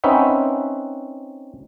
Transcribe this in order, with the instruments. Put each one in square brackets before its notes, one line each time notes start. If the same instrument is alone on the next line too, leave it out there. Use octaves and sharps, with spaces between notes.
[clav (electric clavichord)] C4 C#4 D#4 B4 E5 F#5